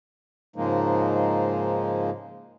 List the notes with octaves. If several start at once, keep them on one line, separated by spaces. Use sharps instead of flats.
G#2 C#3 F3 G#3 A#3 D#4